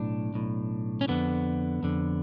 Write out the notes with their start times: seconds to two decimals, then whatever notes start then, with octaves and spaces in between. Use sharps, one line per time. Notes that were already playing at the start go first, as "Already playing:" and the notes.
Already playing: B1 A2 D4
0.34 B1 A2
1.01 C#4
1.08 F2 D3 B3
1.83 F2 D3